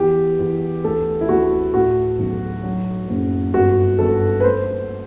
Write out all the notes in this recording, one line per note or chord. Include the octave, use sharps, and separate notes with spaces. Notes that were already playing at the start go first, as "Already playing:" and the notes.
Already playing: E2 G4
E2
D2 A4
E4
D2 F#4
A2 F#4
B1
F#3
F#1
G1 F#4
G1 A4
B4
A3 C5